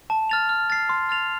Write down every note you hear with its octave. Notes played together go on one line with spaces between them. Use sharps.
A5
F6 A6 F7
F6
A6 C7
C6
F6 A6 F7